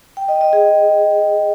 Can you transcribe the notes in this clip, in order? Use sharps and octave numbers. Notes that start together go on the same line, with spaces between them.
G5
D#5
D#5
G#4